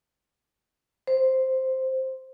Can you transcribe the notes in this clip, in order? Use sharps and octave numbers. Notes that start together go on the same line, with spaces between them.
C5